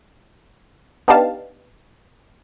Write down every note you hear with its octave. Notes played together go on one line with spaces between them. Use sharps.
B3 D4 D#4 G4 F5 A5